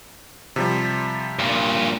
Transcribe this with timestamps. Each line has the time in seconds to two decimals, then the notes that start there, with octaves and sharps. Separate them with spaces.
0.56 C3 F3 G3
1.39 G2 A#2